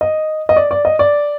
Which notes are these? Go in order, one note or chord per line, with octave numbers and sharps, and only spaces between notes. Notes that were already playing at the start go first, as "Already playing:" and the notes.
D#5
D#5
D5
D5
D#5
D5